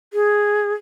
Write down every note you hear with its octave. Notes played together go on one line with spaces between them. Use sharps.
G#4